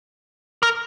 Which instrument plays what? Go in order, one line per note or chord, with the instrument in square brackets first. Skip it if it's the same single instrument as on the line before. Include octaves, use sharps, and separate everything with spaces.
[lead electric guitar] A#4